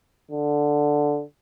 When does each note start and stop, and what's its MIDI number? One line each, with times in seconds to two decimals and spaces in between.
0.31 1.23 50